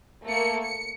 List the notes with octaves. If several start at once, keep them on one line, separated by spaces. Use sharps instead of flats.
A3 A#3 C#7
C#7